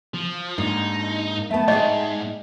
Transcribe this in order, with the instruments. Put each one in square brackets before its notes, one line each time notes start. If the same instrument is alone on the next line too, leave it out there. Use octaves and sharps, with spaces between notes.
[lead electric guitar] F3
[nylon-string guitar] G#2 D4 [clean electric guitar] G#3 A#3 [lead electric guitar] D#4
[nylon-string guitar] A3 B3 [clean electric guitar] E5 A5
[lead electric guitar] G#2 [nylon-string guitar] G#4 D5 G5 [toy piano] D#5